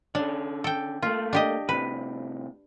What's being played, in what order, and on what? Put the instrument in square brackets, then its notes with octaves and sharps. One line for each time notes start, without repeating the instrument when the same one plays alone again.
[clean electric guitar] D3 C#4 [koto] D4
[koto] A4 G5
[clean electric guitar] A3 A#3 [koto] F4
[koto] D4 G4 D#5
[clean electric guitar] A2 C3 [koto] B4